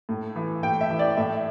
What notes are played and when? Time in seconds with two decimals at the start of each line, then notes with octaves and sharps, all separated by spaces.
0.09 A2
0.36 E3
0.63 A2 G5
0.81 E5
0.90 E3
0.99 D5
1.17 A2 E5